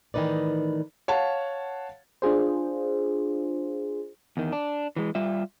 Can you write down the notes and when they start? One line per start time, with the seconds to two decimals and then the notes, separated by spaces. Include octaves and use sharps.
0.14 A2 D#3 E3 D#4 B4 D5
1.08 C#5 F5 F#5 A5
2.22 D4 F4 G#4 C5
4.37 E2 D#3
4.53 D4
4.96 E3 G#3
5.15 G3 F4 E5